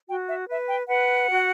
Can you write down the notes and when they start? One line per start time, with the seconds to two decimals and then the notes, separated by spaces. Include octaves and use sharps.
0.08 F#4 G5
0.29 E5
0.48 B4 E5
0.68 G5
0.89 B4 F#5
1.29 F#4